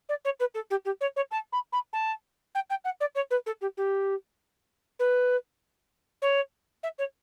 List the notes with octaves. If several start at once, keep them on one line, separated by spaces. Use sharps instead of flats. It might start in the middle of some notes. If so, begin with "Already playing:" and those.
D5
C#5
B4
A4
G4
G4
C#5
C#5
A5
B5
B5
A5
G5
G5
F#5
D5
C#5
B4
A4
G4
G4
B4
C#5
E5
C#5